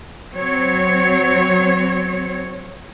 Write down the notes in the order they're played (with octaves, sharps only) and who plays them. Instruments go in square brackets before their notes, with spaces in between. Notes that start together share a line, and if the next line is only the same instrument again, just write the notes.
[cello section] F#3 C4 C#5